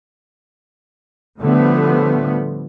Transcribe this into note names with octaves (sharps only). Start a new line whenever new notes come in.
A2 D3 F3 G3 A3 B3